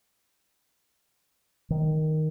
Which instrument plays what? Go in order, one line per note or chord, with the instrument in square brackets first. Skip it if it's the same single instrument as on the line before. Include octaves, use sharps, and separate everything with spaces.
[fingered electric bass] D#3